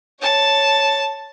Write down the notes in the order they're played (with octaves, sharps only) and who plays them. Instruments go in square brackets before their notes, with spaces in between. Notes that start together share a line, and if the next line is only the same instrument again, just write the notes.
[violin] C#5 A5